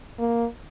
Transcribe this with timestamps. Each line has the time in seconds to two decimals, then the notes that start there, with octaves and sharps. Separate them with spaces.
0.19 A#3